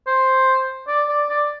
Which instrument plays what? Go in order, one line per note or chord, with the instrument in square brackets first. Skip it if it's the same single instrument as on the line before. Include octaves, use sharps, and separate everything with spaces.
[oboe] C5
D5
D5
D5